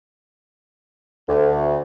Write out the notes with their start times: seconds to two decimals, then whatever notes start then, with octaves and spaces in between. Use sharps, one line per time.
1.29 D2